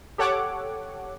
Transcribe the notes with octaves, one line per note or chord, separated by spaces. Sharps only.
G4 A4 C#5 F#5 D6